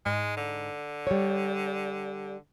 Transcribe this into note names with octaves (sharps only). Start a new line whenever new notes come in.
G#2 G#3
D3
G3 C#5